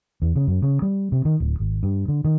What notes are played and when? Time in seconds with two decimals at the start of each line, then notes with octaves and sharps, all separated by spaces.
0.22 E2
0.36 C#3
0.47 F#2
0.62 C#3
0.82 G3
1.12 C3
1.25 D#3
1.40 D1
1.60 G#1
1.83 G2
2.08 D3
2.25 D#3